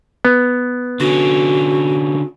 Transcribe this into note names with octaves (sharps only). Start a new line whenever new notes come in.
B3
D3 C#4 F#4